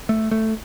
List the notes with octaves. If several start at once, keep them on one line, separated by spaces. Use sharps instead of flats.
A3
A3